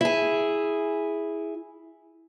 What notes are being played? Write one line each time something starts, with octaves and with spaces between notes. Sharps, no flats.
E4 G#4